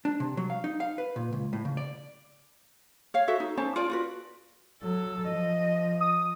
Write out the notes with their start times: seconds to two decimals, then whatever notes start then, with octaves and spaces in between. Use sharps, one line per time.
0.05 D4
0.20 C3
0.37 F#3
0.50 F5
0.64 D#4
0.80 F5
0.98 B4
1.16 A#2
1.33 C#2
1.53 A2
1.65 C#3
1.77 D5
3.14 C#5 F5
3.28 F#4 A4 E5
3.40 D#4
3.57 C#4 C5 C#5 A5
3.76 F4 D5
3.90 F4 F#4 B4
4.83 F#3 A4
5.29 F3 D#5
6.00 D#6